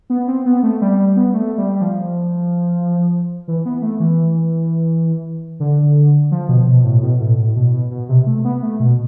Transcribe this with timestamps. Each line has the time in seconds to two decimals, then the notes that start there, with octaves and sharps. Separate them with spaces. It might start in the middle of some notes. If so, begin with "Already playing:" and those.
0.10 B3
0.28 C4
0.46 B3
0.63 A3
0.82 G3
0.99 G3
1.17 B3
1.34 A3
1.58 G3
1.75 G3
1.81 F3
3.48 E3
3.66 B3
3.82 A3
4.00 E3
5.60 D3
6.31 F3
6.49 B2
6.67 B2
6.84 A2
7.02 B2
7.20 A2
7.37 A2
7.56 B2
7.73 B2
7.91 B2
8.09 C3
8.27 A3
8.45 B3
8.62 A3
8.80 B2